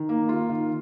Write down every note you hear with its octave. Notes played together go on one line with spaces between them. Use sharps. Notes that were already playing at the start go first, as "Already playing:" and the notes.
Already playing: D#3
A#3
F4
D#3